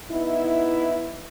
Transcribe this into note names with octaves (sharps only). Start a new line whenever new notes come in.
B3 D#4 E4